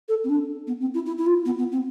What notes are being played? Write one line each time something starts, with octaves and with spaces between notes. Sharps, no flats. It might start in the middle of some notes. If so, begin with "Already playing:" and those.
A4
C4
D4
B3
C4
E4
E4
E4
F4
B3
B3
C4